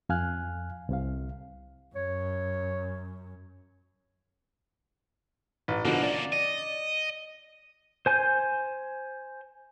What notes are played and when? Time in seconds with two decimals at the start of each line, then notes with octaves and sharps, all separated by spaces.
0.09 F2 F5 G#5 F6 F#6
0.89 C2 C3 F5
1.95 F#2 C#5
5.68 A1
5.85 B2 D3 F3 A#3 C#4
6.03 D5
6.32 D#5
8.06 C5 G#5 G6